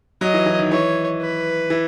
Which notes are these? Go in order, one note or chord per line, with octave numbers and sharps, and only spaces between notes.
F#3 D#5
E3
E3
D#3
E3 C#5
B4
E3